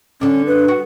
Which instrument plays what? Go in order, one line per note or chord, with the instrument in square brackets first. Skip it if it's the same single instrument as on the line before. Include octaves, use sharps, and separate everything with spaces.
[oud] D3 D4 [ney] C#4
[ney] B4
[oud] F#4